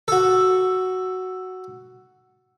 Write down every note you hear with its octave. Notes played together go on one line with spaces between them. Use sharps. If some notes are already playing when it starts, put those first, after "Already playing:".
F#4 A4